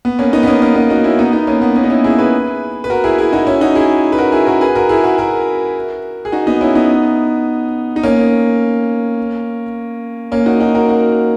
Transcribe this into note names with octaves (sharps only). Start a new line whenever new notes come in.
B3
A#3 C#4
B3 D#4
B3
A#3 C#4
A#3 C#4
B3 D#4
D#4 F#4
C#4 E4
B3 D#4
B3 D#4
A#3 C#4
B3
A#3 C#4
D#4
C#4 E4
E4 G#4
G#4 B4
B4
F#4 A#4
E4 G#4
E4 G#4
D#4 F#4
C#4 E4
D#4 F#4
E4 G#4
B4
F#4 A#4
E4 G#4
F#4 A#4
G#4 B4
F#4 A#4
E4 G#4
F#4 A#4
F#4 A#4
G#4
D#4 F#4
B3 D#4
C#4 E4
B3 D#4
D#4
A#3 C#4
A#3 C#4
D#4 F#4
D#4 F#4
F#4 A#4
F#4 A#4